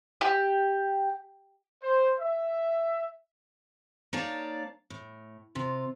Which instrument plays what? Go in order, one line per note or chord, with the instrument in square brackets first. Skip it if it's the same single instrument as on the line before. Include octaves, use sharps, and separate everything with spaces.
[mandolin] G4
[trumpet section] C5
E5
[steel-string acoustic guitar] A#3 D#4 C#5 D5 F5 A5
A2
C3 F4